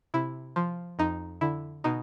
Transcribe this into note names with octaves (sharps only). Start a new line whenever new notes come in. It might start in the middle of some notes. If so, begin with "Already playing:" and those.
C3 E4
F3
F2 D#4
D3 E4
B2 D#4